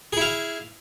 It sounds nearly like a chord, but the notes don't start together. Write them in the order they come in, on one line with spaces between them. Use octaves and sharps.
G#4 E4 F5